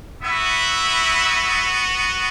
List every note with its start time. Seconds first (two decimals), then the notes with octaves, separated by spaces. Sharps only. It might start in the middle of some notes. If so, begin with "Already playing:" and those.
0.22 B3 E4 F#4 E5